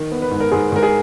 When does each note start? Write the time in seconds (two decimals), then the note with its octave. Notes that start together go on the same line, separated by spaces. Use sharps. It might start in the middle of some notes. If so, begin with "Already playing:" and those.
Already playing: D#3
0.12 B3
0.22 B4
0.31 G#2
0.40 A#4
0.52 G#2 G#4
0.72 G#2 A#4
0.83 G#4